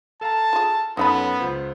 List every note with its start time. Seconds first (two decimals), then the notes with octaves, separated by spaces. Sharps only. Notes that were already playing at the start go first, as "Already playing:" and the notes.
0.21 A4 F5 A5 A#5
0.53 F4 G#4
0.97 F#2 B3 C#4 D#4 A4 F#5 B5
1.40 C#2 F4 C5